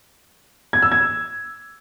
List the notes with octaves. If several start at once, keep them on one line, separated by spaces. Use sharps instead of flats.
G#6
E6
G#6